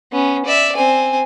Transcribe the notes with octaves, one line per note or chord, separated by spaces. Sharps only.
B3 C#4
D5 E5
C4 G#5